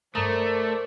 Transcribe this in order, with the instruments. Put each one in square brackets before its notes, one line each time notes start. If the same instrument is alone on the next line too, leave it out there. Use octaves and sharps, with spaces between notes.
[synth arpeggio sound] G2 A#5 D#6 [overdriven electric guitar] A3 [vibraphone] A#4 [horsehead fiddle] C5 D5